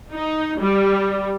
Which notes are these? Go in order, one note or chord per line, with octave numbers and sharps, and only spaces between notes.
D#4
G3